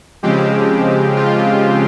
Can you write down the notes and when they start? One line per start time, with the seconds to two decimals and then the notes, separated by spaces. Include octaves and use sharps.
0.23 C#3 F3 G#3 C4 G4
1.16 F4